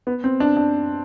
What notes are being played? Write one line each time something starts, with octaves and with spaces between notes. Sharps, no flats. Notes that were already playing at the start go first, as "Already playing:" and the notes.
B3
C4
D4
D4